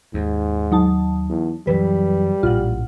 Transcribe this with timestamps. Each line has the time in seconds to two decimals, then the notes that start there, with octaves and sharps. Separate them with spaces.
0.14 D#2 G#2
0.71 F#3 D#4 A5
1.29 E2
1.67 F#2 E3 F#3 G3 B4
2.43 A#1 A2 F4 F#5